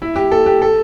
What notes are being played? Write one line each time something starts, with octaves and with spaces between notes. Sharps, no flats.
E4
G4
A4
G4
A4